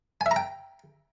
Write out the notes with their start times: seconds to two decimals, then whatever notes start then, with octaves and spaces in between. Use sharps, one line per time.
0.21 G#5
0.26 E5
0.31 A#5
0.36 G5